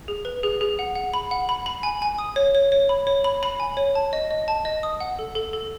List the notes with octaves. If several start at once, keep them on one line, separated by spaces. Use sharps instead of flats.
G#4
B4
G#4
G#4
F#5
F#5
B5
F#5
B5
B5
G#5
G#5
D#6
C#5
C#5
C#5
B5
C#5
B5
B5
G#5
C#5
A5
D#5
D#5
A5
D#5
D#6
F#5
A4
A4
A4